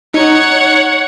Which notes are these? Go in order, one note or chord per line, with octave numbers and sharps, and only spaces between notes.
D#4 C#5 F#5